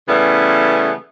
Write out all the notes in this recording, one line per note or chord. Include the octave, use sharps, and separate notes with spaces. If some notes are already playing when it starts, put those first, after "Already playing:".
C#3 E3 G3 A3 B3 C#4